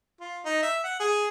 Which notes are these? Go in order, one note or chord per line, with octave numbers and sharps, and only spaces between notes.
F4
D#4
E5
F#5
G#4